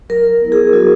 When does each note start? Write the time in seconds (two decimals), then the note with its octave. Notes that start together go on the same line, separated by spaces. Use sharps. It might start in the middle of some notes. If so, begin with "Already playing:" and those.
0.09 F#3 A#4
0.41 B3 E4
0.52 G#4
0.73 F#3 F#4